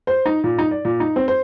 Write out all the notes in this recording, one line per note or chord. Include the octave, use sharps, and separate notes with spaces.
C5
D#4
A#2
D#4
D5
A#2
D#4
C4
C5